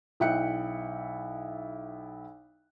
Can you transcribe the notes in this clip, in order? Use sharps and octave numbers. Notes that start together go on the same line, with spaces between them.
B1 E4 G5 F#6 C#7